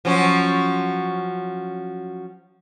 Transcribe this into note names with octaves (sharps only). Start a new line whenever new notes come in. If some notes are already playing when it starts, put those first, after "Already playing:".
F3 F#3 C#4